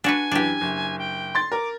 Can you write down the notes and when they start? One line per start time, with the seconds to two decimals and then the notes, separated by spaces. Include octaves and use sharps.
0.04 D4 F#4 B4 G#5
0.32 F#2 E3 D4 G4
0.61 F#1
0.99 G5
1.35 C6 A6
1.52 A#4 D6